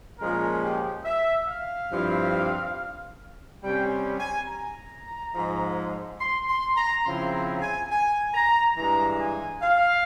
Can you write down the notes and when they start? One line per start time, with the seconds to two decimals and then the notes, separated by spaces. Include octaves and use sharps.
0.19 A#2 F3 G#3 C#4 A#4
0.61 G4
1.04 E5
1.47 F5
1.91 G2 F3 C4 E4
3.62 C3 G3 C#4 G5
4.19 G#5
4.48 A#5
5.34 G#2 F3 G#3
6.20 C6
6.48 C6
6.76 A#5
7.05 C#3 F3 C4 E4 C6
7.33 A#5
7.62 G#5
7.91 G#5
8.34 A#5
8.77 G2 E3 G#3 A#5
9.19 G#5
9.62 F5